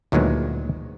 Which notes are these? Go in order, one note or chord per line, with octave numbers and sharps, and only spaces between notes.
D2 A#2 D#3 F#3 G#3 B3